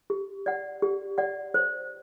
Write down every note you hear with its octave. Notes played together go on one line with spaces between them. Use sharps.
G4
D5 F#5
G4
D5 F#5
C5